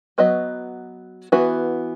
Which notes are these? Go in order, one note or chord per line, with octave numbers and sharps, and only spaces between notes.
F#3 B3 F#4 B4 D#5
E3 B3 F#4 B4